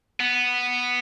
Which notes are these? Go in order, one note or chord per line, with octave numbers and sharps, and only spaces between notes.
B3